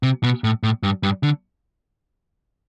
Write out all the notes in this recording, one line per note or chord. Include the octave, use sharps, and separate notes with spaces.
C3
B2
A2
A2
G2
G2
D3